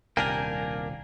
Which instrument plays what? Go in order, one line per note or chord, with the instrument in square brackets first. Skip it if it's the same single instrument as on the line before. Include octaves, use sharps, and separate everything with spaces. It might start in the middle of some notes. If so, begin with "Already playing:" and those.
[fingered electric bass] D#1 C2 [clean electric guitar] A#3 D4 A#4 [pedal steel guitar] G5 G#5